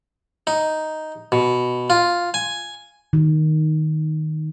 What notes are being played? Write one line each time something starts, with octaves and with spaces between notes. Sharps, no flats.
D#4
B2
F4
G#5
D#3